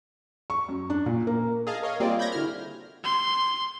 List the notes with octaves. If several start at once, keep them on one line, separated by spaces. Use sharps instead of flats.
C#6
F#2
D4
A#2
A#3
G#4 D#5 F5 A5
A#4 C#5 D#5 F5
G3 A#3 C4 F4 G#4 D5
B5 G6 G#6 A#6
D3 E4 F#4 F6
C6